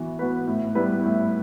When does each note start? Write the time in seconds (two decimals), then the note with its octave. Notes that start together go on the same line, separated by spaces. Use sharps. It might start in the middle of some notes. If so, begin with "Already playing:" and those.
Already playing: E3 B3 F#4
0.19 B3 F#4 B4
0.47 A2
0.75 G3 B3 E4 B4
1.04 A2